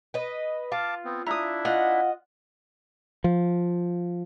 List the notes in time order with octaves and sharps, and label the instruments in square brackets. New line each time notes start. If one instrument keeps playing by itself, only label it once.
[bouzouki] B4 D#5
[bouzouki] F4 [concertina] F5 A5 D6
[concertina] B3 C4
[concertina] D4 E4 E5 [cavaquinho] A#5 D#6
[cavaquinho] F4 F#5 [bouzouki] D#5
[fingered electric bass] F3